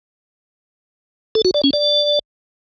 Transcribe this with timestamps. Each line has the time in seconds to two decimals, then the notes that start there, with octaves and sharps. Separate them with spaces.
1.35 A4
1.45 F#4
1.54 D5
1.64 C#4
1.73 D5